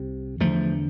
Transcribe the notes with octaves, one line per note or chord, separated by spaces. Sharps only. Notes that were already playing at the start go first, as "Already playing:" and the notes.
Already playing: C2 C3
E2 D3 F3 A3